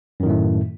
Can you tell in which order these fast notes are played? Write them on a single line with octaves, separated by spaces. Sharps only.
F#2 D#3 A2 A3